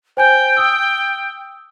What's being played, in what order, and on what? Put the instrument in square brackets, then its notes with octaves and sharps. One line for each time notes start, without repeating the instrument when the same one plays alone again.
[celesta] C5 G#5 G6 [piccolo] G5
[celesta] D#6 E6